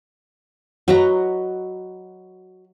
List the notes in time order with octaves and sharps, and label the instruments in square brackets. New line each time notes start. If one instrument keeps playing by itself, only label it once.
[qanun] F#3 B4 A#5 [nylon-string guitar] F#4 D#5 F#5